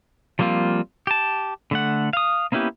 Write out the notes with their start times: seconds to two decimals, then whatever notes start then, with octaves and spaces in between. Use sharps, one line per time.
0.39 F3 G3 A#3 C4 F4
1.07 G4 A5
1.71 D3 A3 F#5
2.13 F5 D#6
2.52 A#3 B3 C#4 E4 G4